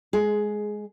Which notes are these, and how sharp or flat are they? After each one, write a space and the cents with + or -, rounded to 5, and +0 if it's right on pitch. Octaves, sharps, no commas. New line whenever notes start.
G#3 +0 G#4 +15